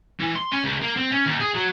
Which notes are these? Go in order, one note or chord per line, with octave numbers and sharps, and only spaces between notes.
E3
C6
C#4
C#2
A#3
C4
C#4
D#2
G#4
F#3